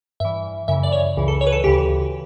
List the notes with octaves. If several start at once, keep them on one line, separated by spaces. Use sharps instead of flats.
G2 E3 E5
F#2 C#3 E3 E5
D5
C#5
C#2 C#3 E3
A4
C#5
B4
A4
D2 C#3 E3 G4